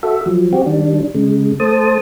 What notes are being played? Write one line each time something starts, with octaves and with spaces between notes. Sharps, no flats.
F#4 A4 E5
F3 F#3
C4 F#4 G4
D#3 G3 D4
C#3 G#3
A3 C5 A5 D#6